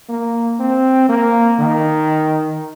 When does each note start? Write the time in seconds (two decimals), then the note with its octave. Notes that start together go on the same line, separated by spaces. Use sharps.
0.09 A#3
0.60 C4
1.09 A#3
1.59 D#3